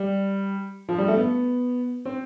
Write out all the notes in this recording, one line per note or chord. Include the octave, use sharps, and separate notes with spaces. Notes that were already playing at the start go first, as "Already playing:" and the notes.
Already playing: G3
F3
G3
A3
B3
C4